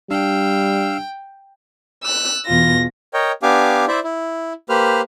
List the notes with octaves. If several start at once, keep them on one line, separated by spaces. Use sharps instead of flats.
G3 D4 F5 G5 E6
E6 F#6
E2 B2 F4 A#6
A#4 C#5 D#5 G5
B3 D4 G4 F5 G#5 D6
E4 C5 D5 E5
E4
A#3 G4 B4 C5 F6